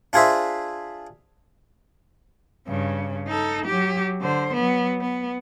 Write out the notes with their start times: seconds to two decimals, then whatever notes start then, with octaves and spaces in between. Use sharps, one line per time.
0.13 D4 F4 G#4 C5 E5
2.68 G2 C#3
3.28 D#4 A4
3.65 F#3 G4
4.21 D3 C5
4.53 F#3 B3
5.01 B3